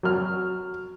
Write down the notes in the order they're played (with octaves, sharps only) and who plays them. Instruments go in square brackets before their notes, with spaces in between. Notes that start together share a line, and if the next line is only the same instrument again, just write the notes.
[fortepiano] F#3 F6